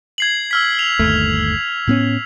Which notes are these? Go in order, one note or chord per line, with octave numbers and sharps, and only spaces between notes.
G#6 C7 F#7
E6 F6 B6
F7
G1 D#2 A3
A2 B3 C#4